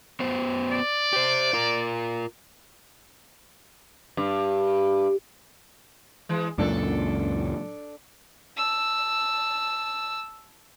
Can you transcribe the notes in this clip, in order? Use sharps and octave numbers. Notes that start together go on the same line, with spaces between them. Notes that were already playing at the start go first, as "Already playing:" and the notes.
B3 F#4 C5
D5
G4 C5
F4 A#4
G2
E3 G#3
C#2 F#2 A#2 D4 A4
A5 E6